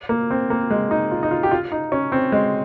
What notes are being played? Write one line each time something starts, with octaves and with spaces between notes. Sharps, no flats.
A#3
C4
A#3
G#3
D#4
F4
D#4
F4
G4
F4
D#4
C#4
C4
G#3